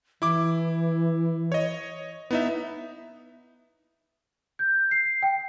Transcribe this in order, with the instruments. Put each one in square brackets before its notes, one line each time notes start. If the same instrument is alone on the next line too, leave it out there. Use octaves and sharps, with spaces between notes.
[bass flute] E3 [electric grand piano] E4 D6
[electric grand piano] C#5 D#5
[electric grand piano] B3 D#4 E5 [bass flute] E4
[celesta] G6
C7
G5